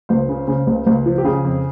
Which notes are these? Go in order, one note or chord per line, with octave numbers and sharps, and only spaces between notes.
C#2 C5
C#3
C#3
C#2
C#2
F3
G4
C#3 G#4
F2